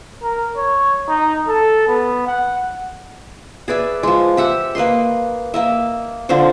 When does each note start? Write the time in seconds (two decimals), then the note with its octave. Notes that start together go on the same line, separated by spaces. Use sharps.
0.23 A#4
0.57 C#5
1.09 D#4
1.48 A4
1.88 B3
2.27 F#5
3.68 G#4 B4 D5 E5
4.03 F3 G#3
4.37 G4 E5 F#5
4.75 A#3 B4 D#5 C6
5.54 A#3 D#5 E5
6.29 D3 F3 C4 C5